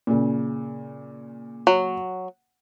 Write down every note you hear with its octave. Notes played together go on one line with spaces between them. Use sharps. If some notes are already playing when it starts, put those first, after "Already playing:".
A#2 C#3
F#3